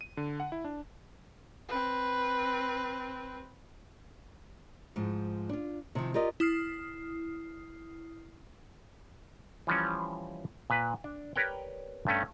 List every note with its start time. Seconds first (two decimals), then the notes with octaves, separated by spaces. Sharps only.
0.01 D#7
0.17 D3
0.40 F#5
0.52 E4
0.64 D4
1.68 C4 B4
4.96 G#2 F3
5.49 D4 F4
5.95 C3 D#3 F3
6.14 F4 G4 A#4 D5 D#5
6.40 E4 D#6 F6 C7
9.67 E3 F3 G3 C#4
10.70 A#2 B4
11.04 D4
11.36 G4 A#4 B4 C#5 D5 G5
12.07 G2 A3 C#4